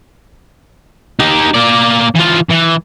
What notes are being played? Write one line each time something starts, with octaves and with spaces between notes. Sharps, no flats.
D#4 G4
A#3 D5
E3 F4
E3